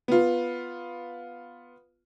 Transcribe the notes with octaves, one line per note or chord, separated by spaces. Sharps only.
B3 F4